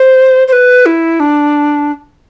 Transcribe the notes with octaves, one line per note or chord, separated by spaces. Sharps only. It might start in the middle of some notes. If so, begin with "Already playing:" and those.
Already playing: C5
C5
B4
E4
D4